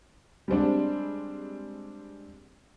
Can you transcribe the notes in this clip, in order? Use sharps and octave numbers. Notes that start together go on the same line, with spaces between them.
G3 G#3 C4 D4